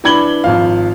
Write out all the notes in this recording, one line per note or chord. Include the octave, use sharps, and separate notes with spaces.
E3 D4 B5 G#6 F#7 G7
G#1 F3 F5